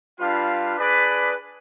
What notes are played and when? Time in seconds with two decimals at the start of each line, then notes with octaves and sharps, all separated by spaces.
0.19 G3 D4 F4 B4 F5
0.77 D4 G#4 B4 D5